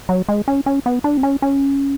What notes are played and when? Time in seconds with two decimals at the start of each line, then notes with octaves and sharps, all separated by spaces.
0.09 F#3
0.29 G#3
0.48 C#4
0.66 C#4
0.86 B3
1.04 D4
1.17 C4
1.23 C#4
1.42 C#4